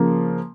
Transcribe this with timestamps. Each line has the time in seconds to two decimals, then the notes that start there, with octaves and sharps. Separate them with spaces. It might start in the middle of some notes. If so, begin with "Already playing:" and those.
Already playing: C#3 F3 A#3